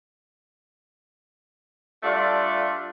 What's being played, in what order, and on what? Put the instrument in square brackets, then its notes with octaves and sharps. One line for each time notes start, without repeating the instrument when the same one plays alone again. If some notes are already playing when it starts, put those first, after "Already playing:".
[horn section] G3 A3 D4 F4